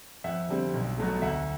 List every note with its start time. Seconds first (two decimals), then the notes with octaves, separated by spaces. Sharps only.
0.24 F2 E5 F#5
0.49 D3 G3 C4
0.74 B1
0.98 B2 F#3 A3
1.22 D2 E5 F#5